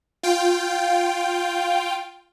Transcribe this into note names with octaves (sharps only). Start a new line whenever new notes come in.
F4 G5